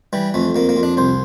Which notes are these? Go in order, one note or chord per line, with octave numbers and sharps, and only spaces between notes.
E3 G3
F2 A3
F2 A#3
A#3
F2
D4
C2 C5